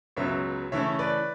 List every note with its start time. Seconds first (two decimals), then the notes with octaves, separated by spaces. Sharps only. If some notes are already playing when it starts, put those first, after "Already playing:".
0.17 C#2 C#3 F#3 B3 C#5 E5
0.72 C#3 E3 A3 C#4 C#5 E5
0.99 B4 D5